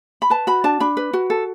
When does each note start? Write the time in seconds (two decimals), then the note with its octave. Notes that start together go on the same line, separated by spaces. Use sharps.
0.22 B5
0.30 B4 A5
0.47 F#4 B5
0.64 D4 A5
0.80 D4 B5
0.97 B4
1.13 F#4
1.30 A4